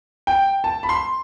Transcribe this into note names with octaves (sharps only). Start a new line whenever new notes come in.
G5
A5
B5
C6